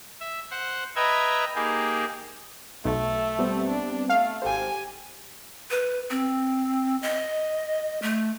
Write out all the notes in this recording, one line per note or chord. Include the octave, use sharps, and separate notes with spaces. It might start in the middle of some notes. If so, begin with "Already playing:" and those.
E5
C5 F#5
B4 D#5 E5 G5 A#5 G#6
A#3 D#4 G4 G#4
B1 A3 E5
G3 B3 C4
D4
A3 F5
G#1 G4 A4 C5 G#5
B4
C4
D#5
A3